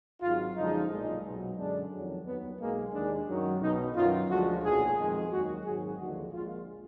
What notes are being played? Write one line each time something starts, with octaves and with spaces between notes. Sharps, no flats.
G#1 G#2 F#3 F4
F#2 D3 F3 G#3 D#4
B1 A#2 G#3
B1 B2 F#3
F#2 D3 G#3 D4
F2 D#3 F#3
D#2 D#3 F#3 B3
B1 B2 G#3 A#3
D#2 D#3 G#3 D4
F#2 D#3 F#3
B1 B2 F#3 D#4
F#2 D#3 F#3 F4
D2 D3 F3 G#3 F#4
B1 A#2 F#3 G#4
F2 D#3 G#3
D#2 D#3 F#3 F#4
G#1 G#2 D#3 F#3 G#4
D#2 D3 F3 G#3 F#4
A#1 A#2 G#3 F4